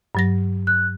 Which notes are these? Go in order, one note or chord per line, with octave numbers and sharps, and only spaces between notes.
G2 F#3 A#6
F#6